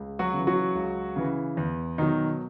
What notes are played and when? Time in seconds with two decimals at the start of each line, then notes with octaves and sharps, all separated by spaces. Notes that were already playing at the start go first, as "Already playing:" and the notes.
Already playing: C#2
0.19 F#3 F#4
0.33 C#3 E3
0.47 F#3 F#4
0.75 C#2
1.16 C#3 E3
1.57 E2
1.98 B2 D#3 F#3 D#4